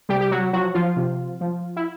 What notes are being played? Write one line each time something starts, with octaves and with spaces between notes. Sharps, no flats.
C3 G3 G4
G4
F#3 F#4
F3 F#3 F#4
F3 F4
C3
F3
E4